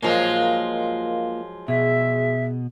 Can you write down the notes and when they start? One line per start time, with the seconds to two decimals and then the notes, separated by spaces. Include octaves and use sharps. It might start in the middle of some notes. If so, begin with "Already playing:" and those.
0.03 F3 F#3 G#3 A#3 F4 A#4 D#5 F5
1.68 B2 G#4 E5